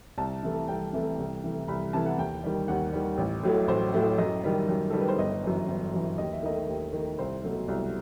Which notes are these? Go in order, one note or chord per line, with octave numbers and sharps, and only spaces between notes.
C2 A5
C3 E3 A3
C2 G5
C3 E3 A3
C2
C3 E3 A3
C2 B5
C3 E3 A3 A5
F#5
D#2 G5
D#3 G3
D#2 F#5
D#3 G3
A1
A2 F#3 A3
A1 C5
A2 F#3 A3
F#2 D#5
D#3 G3
F#2
D#3 G3 A4
B4
C5
G1 D#5
F#2 E3
G1
F#2 E3
D#2 D#5
E5
D#3 A3 D#5
D#2
D#3 A3
C2 C5
B2 F#3 A3
C2